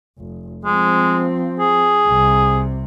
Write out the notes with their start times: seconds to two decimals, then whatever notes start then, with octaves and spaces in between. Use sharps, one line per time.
0.18 F1
0.65 F3 G#3 C4
1.60 G#4
2.06 C2 C3